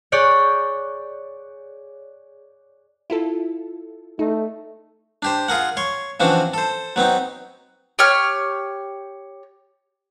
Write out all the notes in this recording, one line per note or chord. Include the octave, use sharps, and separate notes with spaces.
G#4 C#5 D5 F#6 G6
E4 F4 A4
A3 D#4
D4 G4 C5
F4 G#4 A#4 F#5
C#5 C6
C#3 E3 F3 C4 D4 F#4
A4 C5
F#3 B3 C4 D#4
G4 C#5 F6